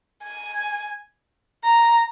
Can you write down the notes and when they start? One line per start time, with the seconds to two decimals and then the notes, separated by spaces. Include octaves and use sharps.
0.24 G#5
1.64 A#5